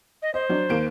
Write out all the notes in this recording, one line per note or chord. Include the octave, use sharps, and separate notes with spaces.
D#5
C5 D#5
F#3 D4
D#2 A#3 D7